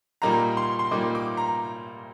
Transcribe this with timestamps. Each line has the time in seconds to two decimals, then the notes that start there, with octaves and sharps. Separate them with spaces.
0.22 A#2 G3 A#3 D#4 A#5
0.57 C6
0.79 C6
0.91 A#2 G3 A#3 D#4 D6
1.15 D6
1.37 A#5